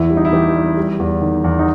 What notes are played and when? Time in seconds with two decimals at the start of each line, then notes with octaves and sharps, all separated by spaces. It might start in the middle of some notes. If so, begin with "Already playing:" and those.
Already playing: E2 E3 E4
0.10 G3
0.17 D#4
0.25 E4
0.33 E3 G4
0.55 G3
0.77 G3
0.99 E2
1.22 D#3
1.44 E2
1.59 D#4